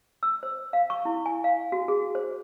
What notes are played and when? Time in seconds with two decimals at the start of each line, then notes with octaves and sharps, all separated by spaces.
0.23 E6
0.43 C5
0.73 F5
0.90 C#6
1.05 E4
1.26 G#5
1.44 F5
1.72 F#4
1.88 G#4
2.15 C5